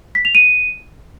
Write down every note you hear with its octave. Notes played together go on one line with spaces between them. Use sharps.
B6
F7
D#7